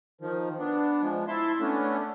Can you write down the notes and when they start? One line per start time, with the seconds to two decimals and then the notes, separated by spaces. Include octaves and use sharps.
0.21 D#3 F3
0.59 B3 D4
1.02 F3 G#3
1.28 E4 E5 A5 C6
1.60 A3 B3 C#4 D4